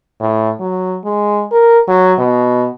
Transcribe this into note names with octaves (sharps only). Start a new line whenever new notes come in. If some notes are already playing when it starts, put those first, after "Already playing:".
A2
F#3
G#3
A#4
F#3
B2